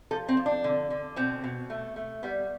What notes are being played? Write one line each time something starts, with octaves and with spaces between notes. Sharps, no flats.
F3 A4
C4
F3
D4
D3
D3
B2 C4
B2
A3
A3
G3 B3